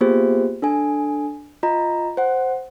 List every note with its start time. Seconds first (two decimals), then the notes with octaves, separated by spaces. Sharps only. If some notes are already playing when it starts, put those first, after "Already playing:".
0.01 A#3 B3 F4 G4 G#4 C5
0.62 D4 A4 G#5
1.63 F4 D#5 A#5
2.17 C5 F#5